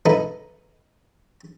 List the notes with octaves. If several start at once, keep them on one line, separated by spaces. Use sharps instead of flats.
D#4 E4 A4 B4 E5